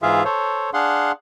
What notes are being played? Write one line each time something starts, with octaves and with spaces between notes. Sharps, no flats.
G#2 E3 F4 G#4 E5 F5
A4 C5 C#5
D4 G#4 F5 F#5 C6